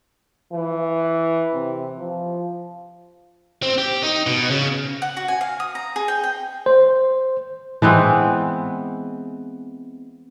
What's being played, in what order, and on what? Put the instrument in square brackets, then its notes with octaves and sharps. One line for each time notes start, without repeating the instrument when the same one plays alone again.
[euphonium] E3
C3
F3
[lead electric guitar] C4
G4
D#4
B2
C#3
[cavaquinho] F#5
F#4
G#5
F5
D#6
A#5
G#4
G5
G5
[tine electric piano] C5
[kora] E3 G#3 B3 C4